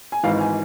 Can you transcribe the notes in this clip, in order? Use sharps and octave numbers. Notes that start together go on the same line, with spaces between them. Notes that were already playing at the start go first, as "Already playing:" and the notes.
G#5
G#1 G#2 E3 F5
G#5